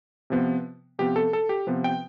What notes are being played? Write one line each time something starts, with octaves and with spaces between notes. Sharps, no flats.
C3 F3 B3
C3 F3 B3 G4
A4
A4
G4
C3 F3 B3
G5